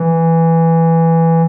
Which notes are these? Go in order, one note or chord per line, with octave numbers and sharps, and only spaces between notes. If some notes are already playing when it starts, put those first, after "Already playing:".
Already playing: E3